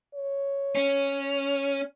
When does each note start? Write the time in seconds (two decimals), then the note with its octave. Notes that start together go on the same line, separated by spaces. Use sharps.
0.15 C#5
0.75 C#4